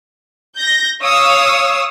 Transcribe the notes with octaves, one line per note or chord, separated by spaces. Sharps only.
G6 A#6
C#5 F5 D#6 E6